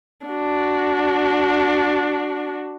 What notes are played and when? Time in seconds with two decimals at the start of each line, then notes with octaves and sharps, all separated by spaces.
0.26 D4 F#4